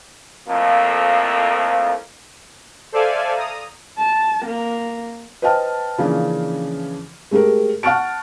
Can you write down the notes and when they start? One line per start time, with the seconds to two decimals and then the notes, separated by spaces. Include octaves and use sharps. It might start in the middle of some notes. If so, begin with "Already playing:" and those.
0.48 F2 A2 F3 A#3
2.92 A4 C5 D5 E5 F5 G#5
3.35 A#5 D#6
3.97 A5
4.45 A#3
5.42 B4 C5 D#5 G5 A5 F6
5.98 C#3 E3 F3 A#3 C#4 D4
7.31 G#3 A3 G4 G#4 A#4
7.83 F#5 A5 C#6 F6 A6 D7